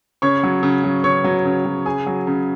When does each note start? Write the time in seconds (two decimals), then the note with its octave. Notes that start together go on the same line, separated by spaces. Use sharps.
0.22 C#3 C#5 C#6
0.43 F#3
0.63 C#3
0.84 F#3
1.04 C#3 C#5 C#6
1.24 F#3
1.45 C#3
1.65 F#3
1.86 C#3 G#4 G#5
2.06 F#3
2.27 C#3